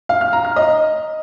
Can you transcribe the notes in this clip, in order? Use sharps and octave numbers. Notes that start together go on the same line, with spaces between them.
F5
F6
A#5
F6
D#5